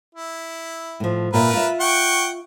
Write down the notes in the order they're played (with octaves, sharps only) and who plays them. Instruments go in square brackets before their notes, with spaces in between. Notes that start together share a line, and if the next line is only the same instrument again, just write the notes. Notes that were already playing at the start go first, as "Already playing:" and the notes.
[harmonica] E4
[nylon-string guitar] A2 F3
[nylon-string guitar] A#2 F4 E5 [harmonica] A#4 B4
[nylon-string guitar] F4 E5
[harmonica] F#5 G5 C#6